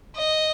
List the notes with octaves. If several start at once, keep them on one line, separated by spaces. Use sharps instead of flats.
D#5